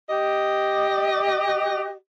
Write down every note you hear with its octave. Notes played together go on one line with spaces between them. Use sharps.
G4 D#5